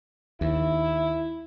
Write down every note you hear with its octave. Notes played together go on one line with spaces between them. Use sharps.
D#2 E4